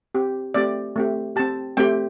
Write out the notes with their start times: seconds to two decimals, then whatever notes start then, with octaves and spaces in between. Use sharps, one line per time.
0.15 C4 G4
0.54 A3 C4 G4 D5
0.96 A3 C4 G4
1.36 C4 G4 A5
1.77 A3 C4 G4 G5